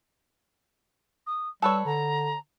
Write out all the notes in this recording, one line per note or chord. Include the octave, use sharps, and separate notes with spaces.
D#6
G3 A4 B4 C#5 E6
D3 A#5